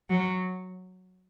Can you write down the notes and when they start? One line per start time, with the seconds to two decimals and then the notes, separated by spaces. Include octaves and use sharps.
0.10 F#3